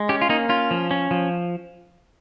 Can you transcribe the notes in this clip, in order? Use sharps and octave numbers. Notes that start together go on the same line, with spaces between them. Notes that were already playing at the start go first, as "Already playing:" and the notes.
Already playing: G#3
C#4 G4
F4
A#3 D#4
C#4 F4
F3
C#4
F3